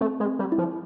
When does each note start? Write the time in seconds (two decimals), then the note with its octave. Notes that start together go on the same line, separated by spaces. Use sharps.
0.01 A3 C4
0.20 G#3
0.26 C4
0.39 G3
0.52 E4
0.58 F3